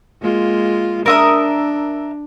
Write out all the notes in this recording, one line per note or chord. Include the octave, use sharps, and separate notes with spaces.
G#3 A#3 F4
D4 A#4 E5 D#6